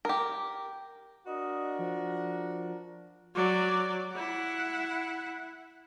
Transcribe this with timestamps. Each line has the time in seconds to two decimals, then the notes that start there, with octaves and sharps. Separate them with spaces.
0.05 G4 A#4
1.27 D4 F#4 A#4 D#5
1.79 F3
3.35 F#3 D5
4.11 E4 F#5